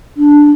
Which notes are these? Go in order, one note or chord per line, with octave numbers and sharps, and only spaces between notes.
D4